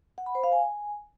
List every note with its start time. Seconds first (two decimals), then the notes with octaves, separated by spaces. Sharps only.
0.18 F#5
0.26 B5
0.35 C5
0.44 F5
0.52 G#5